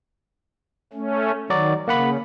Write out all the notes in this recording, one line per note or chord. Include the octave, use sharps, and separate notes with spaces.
A3 C#4
D#3 F#3 F#4 D5
C#3 A#3 F#5 B5